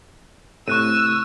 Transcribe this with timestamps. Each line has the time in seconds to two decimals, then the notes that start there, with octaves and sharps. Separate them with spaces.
0.68 A2 C3 C#6 E6 F#6 D#7